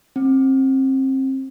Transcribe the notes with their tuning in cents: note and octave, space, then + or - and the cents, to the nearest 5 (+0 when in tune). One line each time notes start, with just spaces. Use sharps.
C4 +30